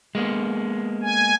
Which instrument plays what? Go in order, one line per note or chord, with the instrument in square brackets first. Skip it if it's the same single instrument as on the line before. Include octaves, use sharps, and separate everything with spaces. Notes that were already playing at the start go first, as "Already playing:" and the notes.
[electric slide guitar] G#3 A#3 B3
[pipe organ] G#5